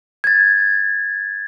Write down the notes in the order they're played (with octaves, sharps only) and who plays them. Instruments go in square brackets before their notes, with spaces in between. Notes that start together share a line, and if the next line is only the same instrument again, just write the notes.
[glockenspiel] G#6 A6